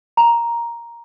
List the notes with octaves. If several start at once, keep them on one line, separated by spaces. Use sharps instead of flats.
A#5